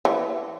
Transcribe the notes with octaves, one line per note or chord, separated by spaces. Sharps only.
E3